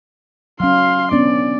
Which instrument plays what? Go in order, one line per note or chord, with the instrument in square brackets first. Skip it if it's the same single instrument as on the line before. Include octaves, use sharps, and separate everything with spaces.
[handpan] F#3 C#4 [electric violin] F5 C6
[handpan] B3 C#4 D4 [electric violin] D5